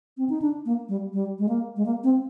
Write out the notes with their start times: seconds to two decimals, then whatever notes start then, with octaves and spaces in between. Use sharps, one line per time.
0.17 C4
0.29 D#4
0.42 D4
0.66 A#3
0.89 G3
1.13 G3
1.39 G#3
1.49 A#3
1.76 G#3
1.86 A#3
2.04 C4